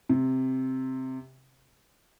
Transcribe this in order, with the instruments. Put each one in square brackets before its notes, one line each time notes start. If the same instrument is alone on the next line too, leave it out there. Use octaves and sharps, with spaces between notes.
[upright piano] C3